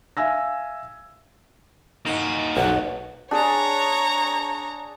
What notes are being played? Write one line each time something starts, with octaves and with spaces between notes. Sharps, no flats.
E5 F5 G#5 E6 A#6
A#3 D#4 F#4
B1 F2 F#5
D4 G#4 C#5 A5 A#5